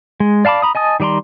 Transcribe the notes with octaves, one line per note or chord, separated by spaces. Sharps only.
G#3
D5 F5 A5 B5 D6
A#5 B5 D#6
D#5 G#5 A5 D#6
D#3 G3 D5 A#5 C6